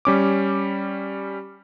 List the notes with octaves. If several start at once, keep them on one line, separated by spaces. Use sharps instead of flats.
G3 C#4 D6